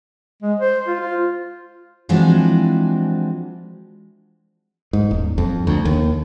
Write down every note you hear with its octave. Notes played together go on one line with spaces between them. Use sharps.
G#3
C5
F4
F4
E3 F3 G#3 C4 D4 F#4
G#2
D#1
F2
D2
D#2